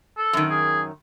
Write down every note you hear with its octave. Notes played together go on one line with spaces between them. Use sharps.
A4
F#2 D#3
G#4